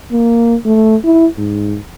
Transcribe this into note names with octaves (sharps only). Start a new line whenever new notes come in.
A#3
A3
E4
G#2